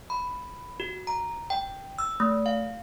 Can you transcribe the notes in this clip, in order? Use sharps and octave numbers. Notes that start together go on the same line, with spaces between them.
B5
F#4
A#5
G5
E6
A3
F5